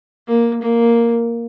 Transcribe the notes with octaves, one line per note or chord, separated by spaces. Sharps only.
A#3
A#3